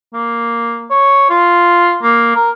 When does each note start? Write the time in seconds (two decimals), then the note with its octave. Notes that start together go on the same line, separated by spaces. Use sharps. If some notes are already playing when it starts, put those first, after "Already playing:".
0.14 A#3
0.90 C#5
1.30 F4
2.03 A#3
2.35 A#4